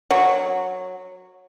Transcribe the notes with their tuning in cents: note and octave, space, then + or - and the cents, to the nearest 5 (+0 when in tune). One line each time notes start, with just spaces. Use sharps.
F#3 -10